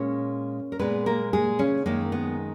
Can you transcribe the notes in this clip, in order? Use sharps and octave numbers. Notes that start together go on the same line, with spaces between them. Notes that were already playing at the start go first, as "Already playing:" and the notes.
Already playing: A#2 G#3 C#4 C#5
A#4
A#2 G#3 B3 B4
A#3 A#4
G#3 G#4
C#3 C#4
F#2 D#3 G#3 A#3
B3